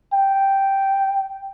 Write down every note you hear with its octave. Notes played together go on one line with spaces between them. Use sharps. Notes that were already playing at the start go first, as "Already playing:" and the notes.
G5